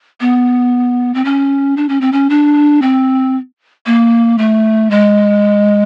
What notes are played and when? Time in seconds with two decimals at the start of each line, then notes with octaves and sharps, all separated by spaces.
0.21 B3
1.14 C4
1.25 C#4
1.77 D4
1.89 C#4
2.01 C4
2.12 C#4
2.30 D4
2.82 C4
3.86 A#3
4.38 A3
4.91 G#3